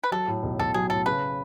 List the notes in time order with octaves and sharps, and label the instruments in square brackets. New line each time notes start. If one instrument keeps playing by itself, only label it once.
[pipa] B4
[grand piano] F#3 [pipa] A4
[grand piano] A2
B1
[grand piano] B1 [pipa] A4
[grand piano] F#3 [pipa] G#4
[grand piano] A2 [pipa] A4
[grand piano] C#3 [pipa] B4